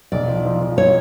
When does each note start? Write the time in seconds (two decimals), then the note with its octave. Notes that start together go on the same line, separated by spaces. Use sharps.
0.12 B1 D5
0.28 F3
0.45 F3
0.61 F3
0.78 C#5